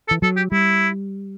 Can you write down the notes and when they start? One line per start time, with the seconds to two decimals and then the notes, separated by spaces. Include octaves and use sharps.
0.08 A4
0.11 E3
0.22 F#3 A4
0.37 G4
0.52 G3 E4